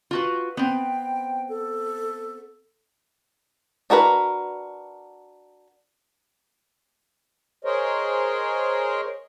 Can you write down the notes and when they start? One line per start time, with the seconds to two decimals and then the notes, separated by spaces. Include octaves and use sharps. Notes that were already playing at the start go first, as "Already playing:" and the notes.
0.11 F4 F#4 B4
0.57 B3 C4 G5
1.49 A4
3.90 D4 F#4 A#4 B4
7.65 G#4 A#4 C5 C#5 D#5